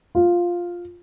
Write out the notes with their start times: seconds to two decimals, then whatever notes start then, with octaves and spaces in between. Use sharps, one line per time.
0.15 F4